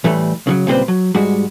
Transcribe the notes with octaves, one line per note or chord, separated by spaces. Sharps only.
A2 E3 G3 A3
C#3 F3 F#3
C#2 A#2 G3 C4 B4 C5
F#3
G#2 G3 G#3 F#4